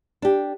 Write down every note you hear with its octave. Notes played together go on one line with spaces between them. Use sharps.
D4 G4